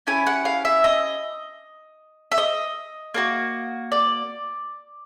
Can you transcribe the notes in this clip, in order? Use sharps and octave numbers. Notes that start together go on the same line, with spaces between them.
C#4 E4 G4 G#5
F#5
F5
E5
D#5
E5
D#5
A#3 D#4 F#4
D5